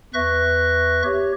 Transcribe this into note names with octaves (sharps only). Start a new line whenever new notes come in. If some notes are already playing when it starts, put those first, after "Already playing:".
E2 B4 E5 C#6 F#6 A#6
G4 C#5